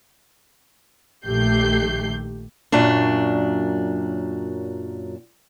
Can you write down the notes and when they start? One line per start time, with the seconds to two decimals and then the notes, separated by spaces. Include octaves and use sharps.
1.25 A#1 D#3 A3 G4 G6 C7
2.72 F#2 A#2 F#3 D4